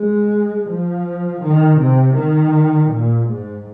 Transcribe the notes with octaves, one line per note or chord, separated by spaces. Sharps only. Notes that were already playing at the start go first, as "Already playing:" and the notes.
Already playing: G#3
F3
D#3
C3
D#3
A#2
G#2